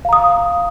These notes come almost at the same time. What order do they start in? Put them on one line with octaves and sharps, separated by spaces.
F5 A#5 D#6